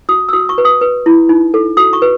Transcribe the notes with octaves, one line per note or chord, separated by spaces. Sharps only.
F#4 D#6
E6
F#4 D#6
C#6
B4
D#6
B4
E4
D#4
A4
F#4 D#6
C#6
B4